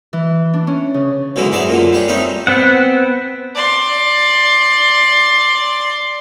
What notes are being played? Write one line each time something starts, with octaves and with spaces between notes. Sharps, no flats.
E3
D4
C#4
C#3
B1 B2 D3 E3 G#3
G#2 F#3 G#4 D5 E5
F#2 A#2 D3
G3 C#4 D4
G3 A3 C4 C#4 D#4
B3 C4 F#5
D5 C6